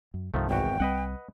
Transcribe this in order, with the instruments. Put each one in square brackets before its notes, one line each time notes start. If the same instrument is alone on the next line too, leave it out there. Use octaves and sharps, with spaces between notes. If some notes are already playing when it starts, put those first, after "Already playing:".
[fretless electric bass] F#2
[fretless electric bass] C2 G2 [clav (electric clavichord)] D#3 F3 A3
[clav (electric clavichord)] G#1 E2 F#4 [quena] G5
[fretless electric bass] C2 G3 C4 [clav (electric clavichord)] B4 D#5 F#5